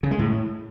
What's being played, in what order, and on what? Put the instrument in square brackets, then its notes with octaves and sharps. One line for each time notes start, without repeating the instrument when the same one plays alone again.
[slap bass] C#3
G#3
A2